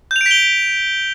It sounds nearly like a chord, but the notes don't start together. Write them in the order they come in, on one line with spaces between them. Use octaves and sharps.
G6 F7 D7 B6 G7